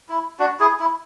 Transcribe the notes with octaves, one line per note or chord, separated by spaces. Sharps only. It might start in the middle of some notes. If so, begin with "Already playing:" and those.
E4
D4 F#4
E4 G#4
E4